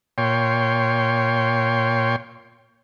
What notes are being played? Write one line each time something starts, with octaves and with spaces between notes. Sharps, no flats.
A#2 C#5 G5 C6